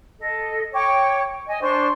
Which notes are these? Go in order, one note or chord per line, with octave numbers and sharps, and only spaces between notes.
A4 D#5
C#5 G5 C#6 D6
D#5 G#5
D4 C5 C6 C#6